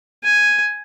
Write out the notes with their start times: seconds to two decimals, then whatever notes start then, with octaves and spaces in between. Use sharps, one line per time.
0.24 G#5